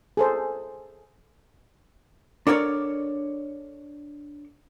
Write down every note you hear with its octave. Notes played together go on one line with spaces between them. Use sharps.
G#4 A4 C5
D4 A4 A#4 C#5 D5